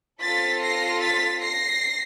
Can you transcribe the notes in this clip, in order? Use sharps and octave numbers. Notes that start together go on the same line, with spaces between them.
C4 F4 A4 A6 B6
A#6 C7
A6 B6
A#6 C7